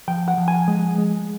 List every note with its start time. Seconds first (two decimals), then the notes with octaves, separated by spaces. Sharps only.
0.08 F3 G5
0.28 F#5
0.38 F3
0.48 G#5
0.68 G#3
0.98 G#3